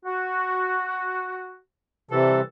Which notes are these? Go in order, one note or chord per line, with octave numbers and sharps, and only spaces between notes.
F#4
C3 E3 G3 A4